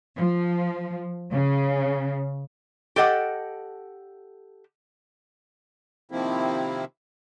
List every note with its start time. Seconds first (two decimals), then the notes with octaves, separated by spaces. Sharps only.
0.17 F3
1.31 C#3
2.96 G4 A4 D#5 F#5
6.11 C3 D#3 F3 A#3 C4 E4